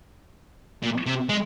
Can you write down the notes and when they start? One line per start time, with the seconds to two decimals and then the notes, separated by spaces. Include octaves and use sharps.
0.83 A#2
1.07 C3
1.29 G#3